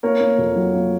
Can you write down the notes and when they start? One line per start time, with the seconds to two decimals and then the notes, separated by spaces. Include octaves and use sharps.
0.03 A#3 A#4 C#5
0.21 A#3
0.38 F2
0.55 F#3
0.74 A#3